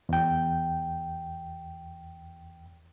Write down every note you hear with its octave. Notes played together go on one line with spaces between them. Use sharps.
E2 G5